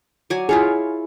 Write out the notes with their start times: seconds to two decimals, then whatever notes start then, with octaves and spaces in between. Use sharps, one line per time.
0.30 F#3 D5 G#5
0.49 E4 F4 G#4 C#5